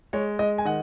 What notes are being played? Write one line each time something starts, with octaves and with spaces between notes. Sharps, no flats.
G#3 C#5
G#3 D#5
G#5
D#3 D#5 F#5